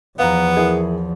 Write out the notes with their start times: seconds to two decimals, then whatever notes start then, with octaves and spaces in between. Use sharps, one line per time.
0.19 E2 F3 B3 F5 A#5
0.56 E4 G#4 A#4